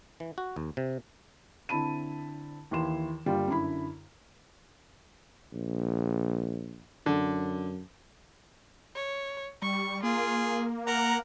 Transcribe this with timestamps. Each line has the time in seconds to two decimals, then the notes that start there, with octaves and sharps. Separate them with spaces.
0.20 E3
0.38 F#4
0.56 D#2
0.77 C3
1.69 D3 C4 E4 A5 B5 D#7
2.71 D#2 E3 E4 C6 E7
3.26 G1 G3 A#3 F4 G5
3.48 F#2 D3 E4 B5
5.53 A#1
7.06 F#2 D3
8.95 C#5
9.62 G3 C#6
10.03 A#3 F4 G#4
10.86 A#4 F#5 A#5